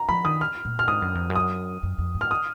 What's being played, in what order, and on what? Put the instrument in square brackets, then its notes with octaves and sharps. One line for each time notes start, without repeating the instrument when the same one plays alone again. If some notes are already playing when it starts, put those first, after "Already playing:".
Already playing: [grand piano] A#5
[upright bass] F3 [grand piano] B5
[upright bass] D#3 [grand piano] D#6
[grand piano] F6
[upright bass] A#2
[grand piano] F6
[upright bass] G#2 [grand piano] D#6
[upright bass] F#2
F2
F#2
[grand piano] D#6
[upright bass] F#2
F2
G#2
[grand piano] F6
D#6